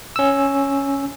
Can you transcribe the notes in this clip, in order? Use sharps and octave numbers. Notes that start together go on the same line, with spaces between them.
C#4 E6